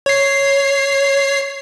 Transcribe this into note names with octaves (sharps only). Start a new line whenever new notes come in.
C#5 C7